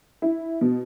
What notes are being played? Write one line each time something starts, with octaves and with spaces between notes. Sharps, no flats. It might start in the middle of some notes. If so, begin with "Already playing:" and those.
E4
B2